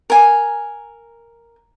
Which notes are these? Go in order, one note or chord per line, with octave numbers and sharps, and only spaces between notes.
A#4 G#5